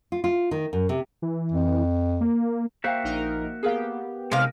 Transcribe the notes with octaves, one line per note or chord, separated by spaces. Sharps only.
F4
F4
D#3
F#2
C3
E3
F2
A#3
A#3 F#4 C5 E5 F5 G5
A#1 D#4 A#4
B3 G4 G#4 A#4 F5
C3 G#3 D#4 A#4 F5